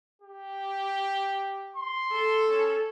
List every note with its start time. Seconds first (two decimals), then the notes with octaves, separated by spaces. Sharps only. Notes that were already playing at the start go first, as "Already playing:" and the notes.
0.22 G4
1.76 C6
2.12 A4
2.49 C#4